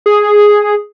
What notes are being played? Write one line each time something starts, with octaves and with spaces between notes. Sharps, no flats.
G#4